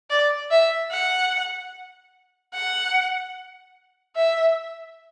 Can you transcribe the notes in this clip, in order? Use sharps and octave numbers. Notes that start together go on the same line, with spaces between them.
D5
E5
F#5
F#5
E5